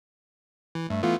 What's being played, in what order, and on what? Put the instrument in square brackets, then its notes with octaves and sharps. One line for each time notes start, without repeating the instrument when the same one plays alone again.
[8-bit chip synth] E3
[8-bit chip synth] G2 [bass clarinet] A3
[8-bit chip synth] E3 A3 B3 [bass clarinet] F4